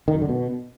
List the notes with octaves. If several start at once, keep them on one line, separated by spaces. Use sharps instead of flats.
D#3
F#2
D3
B2